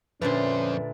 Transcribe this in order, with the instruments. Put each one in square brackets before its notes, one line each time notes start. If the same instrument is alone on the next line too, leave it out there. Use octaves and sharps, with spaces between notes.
[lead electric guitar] F2 C5 [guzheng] A#2 D3 A3 [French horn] C#4 [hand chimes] B4